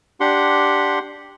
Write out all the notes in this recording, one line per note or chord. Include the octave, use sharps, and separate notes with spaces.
D4 G4 F#5 C6